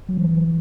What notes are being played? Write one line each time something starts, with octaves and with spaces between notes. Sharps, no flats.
F#3
E3